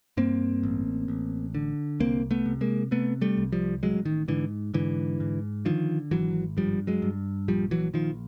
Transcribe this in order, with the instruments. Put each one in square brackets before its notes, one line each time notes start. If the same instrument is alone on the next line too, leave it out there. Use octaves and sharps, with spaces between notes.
[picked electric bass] G2 A#3 C4
A1
A1
D3
C2 A#3 C4
A3 B3
C3
G#3 A#3
C3 A3 B3
G3 A3
C2
F3 G3
A1 F#3 G#3
D#3
G#2 D3 E3
G#2 D3 E3
G#2
D3 D#3 F3
G#1 E3 F#3
G2 F3 G3
F#3 G#3
G2
A#1 F3 G3
E3 F#3
A#1 D#3 F3